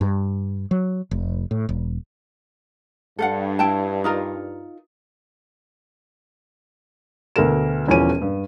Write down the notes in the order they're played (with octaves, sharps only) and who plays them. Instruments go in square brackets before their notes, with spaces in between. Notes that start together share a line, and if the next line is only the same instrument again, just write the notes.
[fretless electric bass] G2
F#3
F1
A2
E1
[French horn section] G2 [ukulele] A4 F5 F#5
[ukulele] E4 G5 A5
D#4 F4 A#4
[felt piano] D2 B2 A4 A#4 E7
E1 E2 F3 C#4 D#7
G2